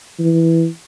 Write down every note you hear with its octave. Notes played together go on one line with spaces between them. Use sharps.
E3